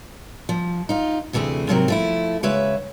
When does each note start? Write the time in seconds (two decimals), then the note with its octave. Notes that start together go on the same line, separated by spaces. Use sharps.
0.49 F3
0.89 D#4 F4
1.33 D2 C3 E3 A3 G#4
1.69 G#2 C3 F#3 C4 A#4
1.88 F3 A3 E4
2.43 C#3 G#3 B4 C#5 E5